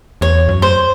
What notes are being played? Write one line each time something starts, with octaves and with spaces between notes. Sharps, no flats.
E2 C#5
F#2
C5